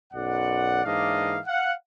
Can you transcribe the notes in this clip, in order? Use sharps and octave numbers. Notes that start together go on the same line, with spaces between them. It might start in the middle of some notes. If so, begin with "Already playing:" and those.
B1 F#2 D5 F#5
G#2 E3 A#3 D4 D#5 F5
F5 F#5